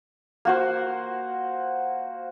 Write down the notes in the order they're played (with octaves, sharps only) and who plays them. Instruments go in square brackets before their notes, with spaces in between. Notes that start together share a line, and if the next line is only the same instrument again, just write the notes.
[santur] A#3 F#4 C5